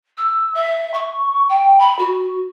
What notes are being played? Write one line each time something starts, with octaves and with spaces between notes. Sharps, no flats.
E6
E5
C#6
G5
B5
F#4